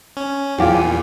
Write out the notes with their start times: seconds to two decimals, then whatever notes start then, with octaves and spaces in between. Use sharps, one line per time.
0.17 C#4
0.58 E2 A#2 F4 G4 G#4
0.74 G#5